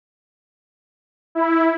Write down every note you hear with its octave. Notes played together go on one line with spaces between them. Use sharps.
E4